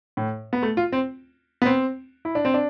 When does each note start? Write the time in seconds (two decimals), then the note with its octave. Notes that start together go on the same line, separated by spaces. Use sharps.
0.17 A2
0.53 B3
0.63 A3
0.77 F4
0.92 C4
1.62 B3
1.66 C4
2.25 E4
2.35 D4
2.45 C4
2.54 D4